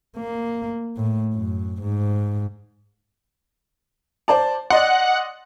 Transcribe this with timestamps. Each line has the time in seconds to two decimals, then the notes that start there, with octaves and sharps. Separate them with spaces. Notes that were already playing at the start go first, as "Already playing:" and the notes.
0.17 A#3
0.97 A2
1.33 F#2
1.82 G#2
4.28 C5 D5 A5
4.70 D5 D#5 F#5 C6